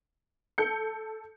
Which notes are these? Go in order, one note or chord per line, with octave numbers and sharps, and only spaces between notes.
A4 G6 C#7